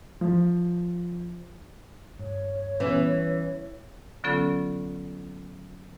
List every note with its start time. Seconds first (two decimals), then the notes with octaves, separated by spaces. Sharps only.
0.21 F3
2.20 G2 C#5
2.80 E3 G3 B3 C#4
4.24 D3 F#3 B3 C#4 F4 A4